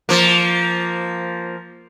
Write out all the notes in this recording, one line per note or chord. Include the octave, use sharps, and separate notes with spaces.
F3 A#3